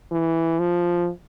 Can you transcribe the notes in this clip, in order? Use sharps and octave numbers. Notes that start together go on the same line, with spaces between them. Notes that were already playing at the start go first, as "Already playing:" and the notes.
E3
F3